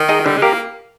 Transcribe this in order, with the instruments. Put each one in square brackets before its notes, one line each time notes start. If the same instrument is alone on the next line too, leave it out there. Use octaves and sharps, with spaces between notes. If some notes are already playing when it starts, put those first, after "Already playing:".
Already playing: [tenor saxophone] D#3
[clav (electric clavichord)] D#4 G#4 D#5
[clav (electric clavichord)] D3 [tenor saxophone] G3
[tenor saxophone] G#3
[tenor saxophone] A#3 [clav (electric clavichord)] G4 A#4